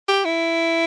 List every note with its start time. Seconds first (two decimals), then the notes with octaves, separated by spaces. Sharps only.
0.08 G4
0.25 E4